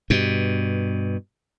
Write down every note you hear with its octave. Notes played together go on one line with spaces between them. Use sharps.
G2 B2